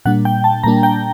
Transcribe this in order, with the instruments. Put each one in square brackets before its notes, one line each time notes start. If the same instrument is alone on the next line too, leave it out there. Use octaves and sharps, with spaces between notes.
[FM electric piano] A#2 G3 A#3 D4 F#5
G5
A5
A#2 G3 A#3 D4 A#5
G5